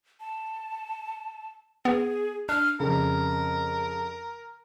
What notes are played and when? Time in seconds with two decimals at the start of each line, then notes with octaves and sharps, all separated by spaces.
0.20 A5
1.85 B3 G#4
2.49 D4 F6
2.80 F2 C#3 A#4